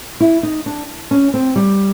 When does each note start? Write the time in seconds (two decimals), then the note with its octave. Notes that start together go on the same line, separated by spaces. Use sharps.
0.20 E4
0.43 D#4
0.66 D4
1.11 C#4
1.34 C4
1.56 G3